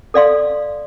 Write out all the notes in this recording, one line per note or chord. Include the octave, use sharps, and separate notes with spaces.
A4 D5 F5 C6